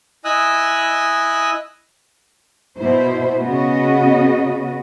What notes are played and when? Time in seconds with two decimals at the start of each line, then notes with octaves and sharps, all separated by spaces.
0.25 E4 D#5 G#5 D#6 E6 F#6
2.76 B2 E4 C5
3.42 C#3 B3 F#4 D#5